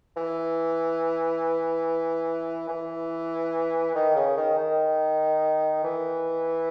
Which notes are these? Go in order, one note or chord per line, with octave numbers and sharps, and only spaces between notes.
E3
E3
D#3
C#3
D#3
D#3
E3